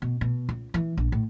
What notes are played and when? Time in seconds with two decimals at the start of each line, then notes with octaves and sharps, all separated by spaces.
0.02 B2
0.21 B2
0.49 C#2
0.74 E3
0.97 A#1
1.12 A2